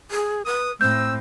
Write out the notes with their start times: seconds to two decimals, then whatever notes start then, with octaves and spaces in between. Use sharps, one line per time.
0.11 G#4
0.46 B4 D#6
0.81 A2 C4 E6 G6